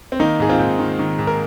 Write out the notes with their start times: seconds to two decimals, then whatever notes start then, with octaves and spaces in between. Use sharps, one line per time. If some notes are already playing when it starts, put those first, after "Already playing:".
0.12 C4
0.19 D#3 A#3 D#4
0.40 G#2 G#4
0.49 C4 F4
0.59 G#2
0.79 D#3
0.99 D#3
1.19 G#2
1.27 A#4